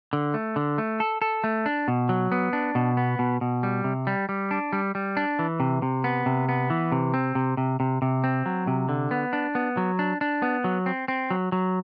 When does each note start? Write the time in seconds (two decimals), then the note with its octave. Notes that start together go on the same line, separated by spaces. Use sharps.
0.13 D3
0.34 A3
0.56 D3
0.78 A3
1.00 A4
1.22 A4
1.44 A3
1.66 D4
1.88 B2
2.09 F#3
2.32 B3
2.53 D4
2.75 B2
2.97 B3
3.19 B2
3.41 B2
3.63 G3
3.84 C3
4.07 G3
4.29 G3
4.51 D4
4.73 G3
4.95 G3
5.17 D4
5.39 E3
5.60 C3
5.82 C3
6.04 B3
6.26 C3
6.49 B3
6.70 E3
6.92 C3
7.14 C4
7.35 C3
7.57 C3
7.80 C3
8.02 C3
8.24 C4
8.46 F#3
8.67 C3
8.89 D3
9.11 B3
9.33 D4
9.55 B3
9.77 F#3
9.99 D4
10.21 D4
10.42 B3
10.64 F#3
10.86 C4
11.08 C4
11.30 F#3
11.52 F#3